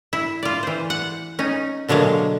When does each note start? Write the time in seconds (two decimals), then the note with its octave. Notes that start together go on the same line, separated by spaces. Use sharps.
0.13 E4
0.43 F4 D5
0.63 E3 C5
0.90 F#5
1.39 C#4 D#4
1.88 B2 D3 F#3 G#3 A#3